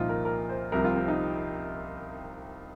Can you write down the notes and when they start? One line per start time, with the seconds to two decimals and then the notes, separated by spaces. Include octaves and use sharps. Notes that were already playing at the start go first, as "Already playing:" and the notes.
Already playing: C2 A#2 F3 D#4 F4
0.09 A#4
0.25 A#4
0.49 C5
0.72 C2 C3 F3 A#4
0.84 F4
0.96 C4
1.08 D#4